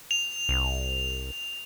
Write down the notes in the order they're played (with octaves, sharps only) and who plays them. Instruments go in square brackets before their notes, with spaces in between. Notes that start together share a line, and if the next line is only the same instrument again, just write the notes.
[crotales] F7
[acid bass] C2